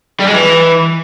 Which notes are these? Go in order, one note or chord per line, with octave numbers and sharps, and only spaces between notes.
G3
G#3
E3